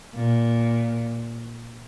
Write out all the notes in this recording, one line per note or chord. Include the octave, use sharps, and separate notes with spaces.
A#2